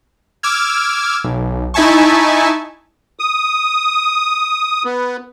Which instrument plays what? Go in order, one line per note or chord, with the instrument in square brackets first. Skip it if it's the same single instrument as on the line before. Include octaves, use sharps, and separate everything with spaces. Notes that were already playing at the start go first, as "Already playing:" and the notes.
[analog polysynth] D6 E6 F6 G#6
B1
D#4 E4 E5 G#5 A5 C#6
[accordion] D#6
B3